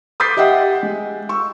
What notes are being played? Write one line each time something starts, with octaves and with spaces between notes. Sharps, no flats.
D6 D#6 G6 A6 B6 C7
G4 D#5 E5 F#5 G5
G#3
C#6 E6